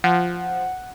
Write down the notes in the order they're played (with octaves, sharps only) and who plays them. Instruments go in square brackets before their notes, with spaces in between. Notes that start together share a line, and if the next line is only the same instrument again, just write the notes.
[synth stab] F3 [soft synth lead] F#5